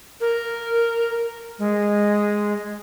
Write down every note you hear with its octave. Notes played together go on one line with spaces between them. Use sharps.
A#4
G#3